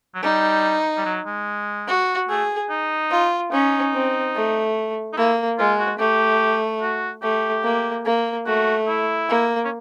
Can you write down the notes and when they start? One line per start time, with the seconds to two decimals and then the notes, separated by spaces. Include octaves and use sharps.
0.15 F#3
0.23 G3 D#4
0.98 G3
1.05 F#3
1.26 G#3
1.88 F#4
2.29 A3 G#4
2.70 D#4
3.11 F4
3.52 C#4 D#4
3.93 C4
4.35 A3
5.13 D#4
5.17 A#3 E4
5.58 G#3 F4
5.78 F#4
5.99 A3 G4
6.82 F#4
7.22 A3 G4
7.64 A#3
8.05 A#3
8.47 A3 F#4
8.88 E4
9.29 A#3
9.65 C#4